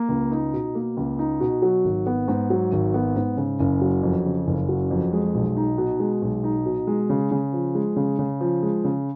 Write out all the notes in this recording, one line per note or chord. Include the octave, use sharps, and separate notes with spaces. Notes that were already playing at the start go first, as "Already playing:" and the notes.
Already playing: A#3
C#2
D#4
B2
A#3
C#2
D#4
B2
F#3
G#1
B3
G#2
F#3
G#1
B3
G#2
C#3
F#1
F#3
F2
C#3
F#1
F#3
F2
G#3
B1
D#4
B2
G#3
B1
D#4
B2
G#3
C#3
C#3
F3
G#3
C#3
C#3
F3
G#3
C#3